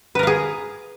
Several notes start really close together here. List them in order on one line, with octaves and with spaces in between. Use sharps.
B4 A#4 F5 G#4